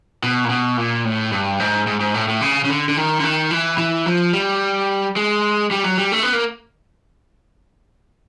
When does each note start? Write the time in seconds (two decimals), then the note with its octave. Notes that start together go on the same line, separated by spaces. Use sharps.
0.23 B2
0.44 A#2
0.50 B2
0.77 A#2
1.05 A2
1.32 G2
1.60 G#2
1.87 G#2
2.00 G#2
2.14 A2
2.28 A2
2.41 C#3
2.64 C#3
2.70 D3
2.89 D3
2.97 D#3
3.20 D3
3.23 D#3
3.51 E3
3.78 E3
4.06 F3
4.33 G3
5.16 G#3
5.71 G3
5.84 F#3
5.98 G3
6.12 A3
6.23 B3
6.33 A#3